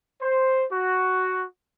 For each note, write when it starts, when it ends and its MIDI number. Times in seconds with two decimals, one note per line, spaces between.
0.22 0.64 72
0.71 1.44 66